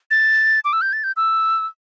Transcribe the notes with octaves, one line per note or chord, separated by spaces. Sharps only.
A6
D6
E6
G6
A6
G6
E6